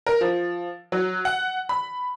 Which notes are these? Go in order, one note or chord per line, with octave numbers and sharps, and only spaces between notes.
A#4
F3
F#3
F#5
B5